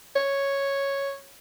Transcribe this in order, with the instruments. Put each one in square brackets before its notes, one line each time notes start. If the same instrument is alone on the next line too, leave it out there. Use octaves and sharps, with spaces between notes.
[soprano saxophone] C#5